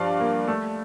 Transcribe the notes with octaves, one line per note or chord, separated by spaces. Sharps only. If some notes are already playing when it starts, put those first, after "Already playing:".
Already playing: G2 F3 D5 F5
A#3
A3